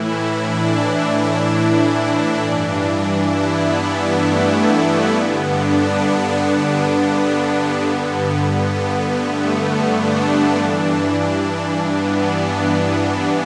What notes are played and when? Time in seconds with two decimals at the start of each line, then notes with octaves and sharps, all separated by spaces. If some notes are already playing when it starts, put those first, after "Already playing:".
Already playing: A2 E3 E4
0.41 D4
1.77 D4
2.44 G2 E3
3.12 E4
3.46 B3
3.79 B3
4.13 A3
4.47 B3
4.81 A3
5.15 G2 D3 B3
5.48 D4
5.82 B3
6.50 B3
7.17 B3
7.85 G2 D3
8.53 B3
8.86 B3
9.20 A3
9.54 A3
9.88 D4
10.56 G2 E3
11.91 B3
12.25 B3